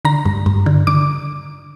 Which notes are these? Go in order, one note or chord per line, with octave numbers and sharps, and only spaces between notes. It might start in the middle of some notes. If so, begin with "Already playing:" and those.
D3 A#5
G2
G2
D3
D3 D6